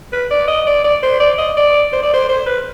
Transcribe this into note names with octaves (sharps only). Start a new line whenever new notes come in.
B4
D5
D#5
D5
D5
C5
D5
D#5
D5
C5
D5
C5
C5
B4